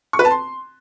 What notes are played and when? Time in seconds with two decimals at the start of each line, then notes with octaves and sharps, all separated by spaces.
0.13 C#6
0.19 B4
0.25 A5
0.31 C6